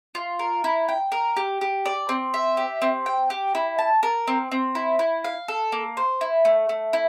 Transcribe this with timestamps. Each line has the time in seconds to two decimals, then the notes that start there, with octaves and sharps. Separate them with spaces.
0.15 F4
0.39 A#4
0.64 E4
0.89 G5
1.12 A#4
1.37 G4
1.61 G4
1.86 D5
2.09 C4
2.34 E5
2.57 G4
2.82 C4
3.06 G5
3.30 G4
3.55 E4
3.79 A5
4.03 A#4
4.28 C4
4.52 C4
4.75 E4
4.99 E4
5.24 F5
5.48 A4
5.72 A#3
5.97 C5
6.21 E4
6.45 A3
6.69 A3
6.93 E4